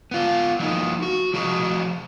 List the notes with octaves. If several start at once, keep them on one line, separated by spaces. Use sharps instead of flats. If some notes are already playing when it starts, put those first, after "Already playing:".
B3 F4
F3 A#3 D#4
F#4
F3 F#4 G#4 D#5